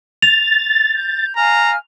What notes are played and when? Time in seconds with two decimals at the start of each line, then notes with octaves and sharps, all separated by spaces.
0.22 A6 F7
0.93 G6
1.37 F5 G#5 A#5 F6